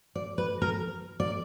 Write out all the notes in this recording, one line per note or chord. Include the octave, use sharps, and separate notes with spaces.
D5
B4
A#4
D5